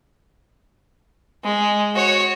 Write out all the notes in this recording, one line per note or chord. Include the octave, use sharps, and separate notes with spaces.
G#3
F#4 C#5